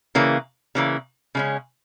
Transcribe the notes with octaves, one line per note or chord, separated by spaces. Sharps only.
C#3 E3 A#3
C#3 E3 A#3
C#3 G#3 C#4